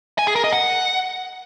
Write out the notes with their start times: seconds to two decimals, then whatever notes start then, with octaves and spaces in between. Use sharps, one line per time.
0.19 G#5
0.27 G#4
0.36 A#4
0.44 D#5
0.52 F#5